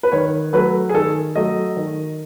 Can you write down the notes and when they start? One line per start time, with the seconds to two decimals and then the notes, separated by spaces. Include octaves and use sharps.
0.03 B4
0.12 D#3 C#5
0.53 F#3 A3 B4
0.89 G#4
0.94 D#3 A4
1.36 F#3 A3 D#5
1.77 D#3